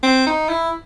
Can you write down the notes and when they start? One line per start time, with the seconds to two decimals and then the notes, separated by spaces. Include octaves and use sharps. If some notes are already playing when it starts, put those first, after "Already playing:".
0.03 C4
0.27 D#4
0.49 E4